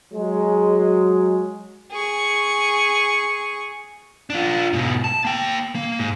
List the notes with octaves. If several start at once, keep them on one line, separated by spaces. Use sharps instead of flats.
F#3 G#3
G#4 C#6
D4 F4
G#2 B2
A5
A#3 G5
A#3
G#2